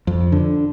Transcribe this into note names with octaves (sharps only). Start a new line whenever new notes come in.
F2
D3